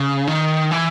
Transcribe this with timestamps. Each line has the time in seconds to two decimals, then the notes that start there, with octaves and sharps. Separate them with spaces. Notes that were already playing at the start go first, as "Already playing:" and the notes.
Already playing: C#3
0.27 D#3
0.71 E3